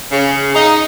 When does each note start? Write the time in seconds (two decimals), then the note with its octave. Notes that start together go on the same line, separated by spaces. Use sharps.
0.11 C#3
0.55 D#4